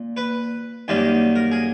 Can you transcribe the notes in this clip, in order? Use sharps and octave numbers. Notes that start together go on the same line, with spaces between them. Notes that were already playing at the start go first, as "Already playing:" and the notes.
Already playing: A#2
B4
F#2 D#3 G3 A#3
A#4
G#4